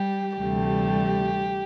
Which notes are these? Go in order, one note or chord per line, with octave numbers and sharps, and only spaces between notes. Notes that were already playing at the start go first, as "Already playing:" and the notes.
Already playing: G3 G4
D2 C3 E3 G3 A3 G4